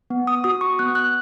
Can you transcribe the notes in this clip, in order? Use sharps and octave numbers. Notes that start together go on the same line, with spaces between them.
B3
D#6
F#4 D#6
C#6
B3 F#6
F#6